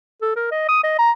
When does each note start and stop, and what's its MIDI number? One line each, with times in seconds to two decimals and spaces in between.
0.22 0.32 69
0.36 0.49 70
0.51 0.67 75
0.69 0.82 87
0.83 0.98 75
0.98 1.11 82